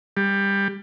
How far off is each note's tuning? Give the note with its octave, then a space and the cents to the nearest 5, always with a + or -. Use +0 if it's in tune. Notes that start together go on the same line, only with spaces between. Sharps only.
G3 +15